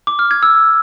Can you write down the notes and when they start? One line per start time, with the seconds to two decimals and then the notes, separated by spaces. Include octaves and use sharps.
0.07 D6
0.19 F6
0.31 G#6
0.43 E6